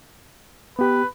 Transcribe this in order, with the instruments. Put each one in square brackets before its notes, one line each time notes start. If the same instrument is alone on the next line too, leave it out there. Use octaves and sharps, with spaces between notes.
[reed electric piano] B3 G4 [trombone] B4